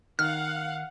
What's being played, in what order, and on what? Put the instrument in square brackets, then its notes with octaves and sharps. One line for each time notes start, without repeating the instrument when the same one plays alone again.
[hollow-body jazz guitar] D#3 [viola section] F5 F#5 [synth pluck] F6